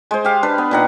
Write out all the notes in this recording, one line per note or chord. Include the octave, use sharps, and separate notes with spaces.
G#3 C5
G4 F5
D4 B4
B3
A#2 D#3 F#5